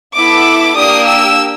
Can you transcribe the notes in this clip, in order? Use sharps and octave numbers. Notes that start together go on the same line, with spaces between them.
B3 E4 A4 D6
A#3 D4 G4 D#6
E6